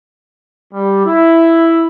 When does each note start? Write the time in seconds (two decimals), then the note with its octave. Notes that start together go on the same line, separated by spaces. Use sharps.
0.73 G3
1.05 E4